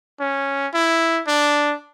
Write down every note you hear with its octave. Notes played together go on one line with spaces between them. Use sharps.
C#4
E4
D4